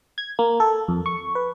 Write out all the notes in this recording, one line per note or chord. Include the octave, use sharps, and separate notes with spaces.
G#6
A#3
A4
F2
C#6
B4